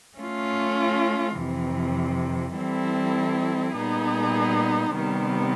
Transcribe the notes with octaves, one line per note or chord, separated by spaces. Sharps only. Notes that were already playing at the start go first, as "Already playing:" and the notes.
A3 C#4 F4
F2 C3 E3
E3 G3 C4 E4 A4
A#2 G3 B3 D#4 G#4
C3 D#3 G3 B3